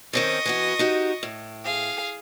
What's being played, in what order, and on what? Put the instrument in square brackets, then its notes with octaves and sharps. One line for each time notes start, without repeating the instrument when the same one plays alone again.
[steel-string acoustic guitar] D#3 C4 C#4 [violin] D#5 C#6
[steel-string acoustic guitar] E3 B3 F#4
D#4 F#4 G4
A2
[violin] G#4 F5